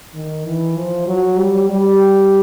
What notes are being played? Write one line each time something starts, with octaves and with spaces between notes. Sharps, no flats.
D#3
E3
F3
F#3
G3
G3